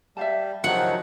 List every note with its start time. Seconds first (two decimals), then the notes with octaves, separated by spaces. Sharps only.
0.17 G3 E5 F5 A5
0.64 C3 D#3 F3 F#3 F#4 G4 F#5